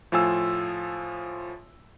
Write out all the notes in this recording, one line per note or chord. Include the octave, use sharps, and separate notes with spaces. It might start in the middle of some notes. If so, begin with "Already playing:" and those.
A2 F3 F4 G#5 E6